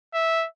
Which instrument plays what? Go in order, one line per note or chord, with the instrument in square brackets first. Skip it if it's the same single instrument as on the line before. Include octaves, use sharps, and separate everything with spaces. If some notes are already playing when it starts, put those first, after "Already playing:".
[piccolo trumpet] E5